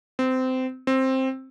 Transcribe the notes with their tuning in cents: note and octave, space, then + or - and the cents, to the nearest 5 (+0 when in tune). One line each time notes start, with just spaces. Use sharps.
C4 -20
C4 +10